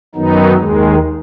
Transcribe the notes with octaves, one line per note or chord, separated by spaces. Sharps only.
F#2 D#3 F#3 B3 D#4
D#2 D#3 G#3